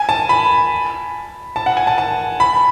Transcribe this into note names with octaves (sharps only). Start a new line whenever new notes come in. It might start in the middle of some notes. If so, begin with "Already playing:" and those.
Already playing: G#5
A5
B5
A5
F#5
G#5
A5
A5
B5